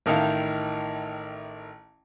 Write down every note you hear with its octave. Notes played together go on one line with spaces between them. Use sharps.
A1 D#3 D#4 E4 F5